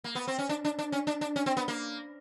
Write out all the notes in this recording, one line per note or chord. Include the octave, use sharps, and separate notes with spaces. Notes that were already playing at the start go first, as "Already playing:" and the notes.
A#3
B3
C4
C#4
D4
D4
D4
C#4
D4
D4
C#4
C4
B3
A#3